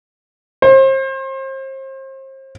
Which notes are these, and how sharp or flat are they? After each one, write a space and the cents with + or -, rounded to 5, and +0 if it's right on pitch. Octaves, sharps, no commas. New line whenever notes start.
C5 +35